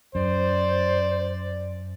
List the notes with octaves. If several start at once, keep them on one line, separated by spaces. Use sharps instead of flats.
F#2 C5 D5